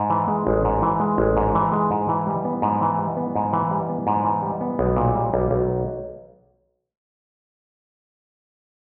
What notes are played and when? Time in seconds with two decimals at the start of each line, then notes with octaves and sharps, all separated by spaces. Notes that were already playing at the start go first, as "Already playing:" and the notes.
Already playing: G#2
0.10 E3
0.28 G#3
0.47 A1
0.65 G#2
0.83 E3
1.00 G#3
1.18 A1
1.37 G#2
1.55 E3
1.72 G#3
1.91 G#2
2.09 E3
2.27 G3
2.45 B3
2.62 G#2
2.81 E3
2.99 G3
3.17 B3
3.35 G#2
3.53 E3
3.71 G3
3.89 B3
4.07 G#2
4.24 E3
4.42 G3
4.61 B3
4.79 B1
4.96 A#2
5.15 G3
5.34 B1
5.51 B1